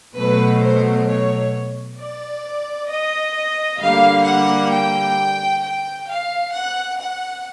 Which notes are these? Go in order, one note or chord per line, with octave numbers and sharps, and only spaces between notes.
B2 F#3 A3 B4
C5
C#5
D5
D#5
D3 G3 A#3 F5
F#5
G5
G5
F5
F#5
F#5